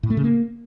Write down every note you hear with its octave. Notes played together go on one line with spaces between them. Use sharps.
A2
A3
C#3
A#3